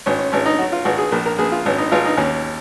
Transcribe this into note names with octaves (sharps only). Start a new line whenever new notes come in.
G#1 C#4
C#4
G#1 C#4
D#4
F#3 F#4
F4
G#1 F#4
G#4
A#1 A#4
A#4
A#1 G#4
F4
G#1 C#4
D#4
G#1 F4
D#4
D#2 C#4